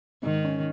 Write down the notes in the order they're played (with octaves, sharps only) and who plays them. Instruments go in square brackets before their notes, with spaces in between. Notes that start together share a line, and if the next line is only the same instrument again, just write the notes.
[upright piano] G#2 [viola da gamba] D#3
[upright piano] C#4